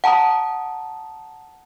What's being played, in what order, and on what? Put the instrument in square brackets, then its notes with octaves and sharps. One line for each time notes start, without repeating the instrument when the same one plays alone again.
[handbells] F#5 A5 A#5 D#6